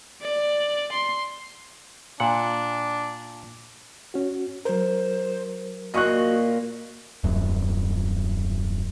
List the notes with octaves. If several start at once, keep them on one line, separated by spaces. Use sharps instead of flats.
D5
C6
A#2 D4 F#5
C#4 F#4
F#3 A#4 C5
A#2 F#4 D#5 C#6 F#6
D#1 F#2